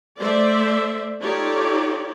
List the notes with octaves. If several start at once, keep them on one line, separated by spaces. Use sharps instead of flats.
A3 C5 D5 E5
D#4 F4 G4 A4 C#5 D5